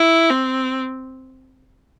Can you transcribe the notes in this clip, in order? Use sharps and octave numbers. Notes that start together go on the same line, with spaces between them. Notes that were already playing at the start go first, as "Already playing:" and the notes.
Already playing: E4
C4